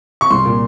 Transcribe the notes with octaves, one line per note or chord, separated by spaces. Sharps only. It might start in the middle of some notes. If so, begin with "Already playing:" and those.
C#6
C2 C6
A#2